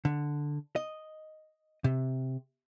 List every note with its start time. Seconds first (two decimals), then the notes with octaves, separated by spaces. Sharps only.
0.05 D3
0.76 D#5
1.84 C3